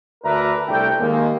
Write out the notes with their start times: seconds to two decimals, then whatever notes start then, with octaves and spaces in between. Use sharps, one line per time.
0.24 D2 D4 A#4 B4 E5 A#5
0.68 C2 C3 A3 D4 A4 G5
0.99 D#2 G#3 A#3